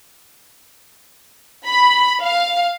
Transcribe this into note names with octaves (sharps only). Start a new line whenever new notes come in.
B5
F5